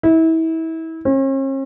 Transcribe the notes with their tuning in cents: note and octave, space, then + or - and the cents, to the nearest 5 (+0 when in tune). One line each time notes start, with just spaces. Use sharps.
E4 -30
C#4 -45